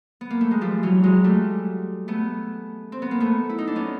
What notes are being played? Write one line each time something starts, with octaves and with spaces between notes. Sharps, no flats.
B3
A#3
A3
G#3
F3 G3
E3 F#3
F#3 G#3
G3 A3
A3 B3
C4
B3
A#3
A3 B3
E4
D#4
D4
B3 C#4